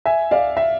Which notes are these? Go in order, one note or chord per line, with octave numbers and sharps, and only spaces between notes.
E5 G#5
D5 F5
E5